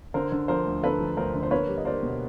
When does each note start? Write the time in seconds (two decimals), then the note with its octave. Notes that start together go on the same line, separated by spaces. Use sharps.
0.14 D3 A#4 C5
0.32 D3
0.48 F3 A#4 C5
0.66 D2
0.82 D3 A4 B4
1.00 F3
1.17 D2 A#4 C5
1.34 D3
1.43 C5
1.51 A#3 B4 C#5
1.68 G3
1.77 D#5
1.85 A#3 C5 D5
2.03 B2